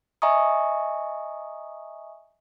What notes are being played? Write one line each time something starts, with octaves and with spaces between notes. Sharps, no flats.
D#5 E5 G#5 A#5 C#6 D#6